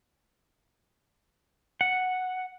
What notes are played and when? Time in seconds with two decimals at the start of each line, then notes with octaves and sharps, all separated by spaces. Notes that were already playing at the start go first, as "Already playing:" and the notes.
1.81 F#5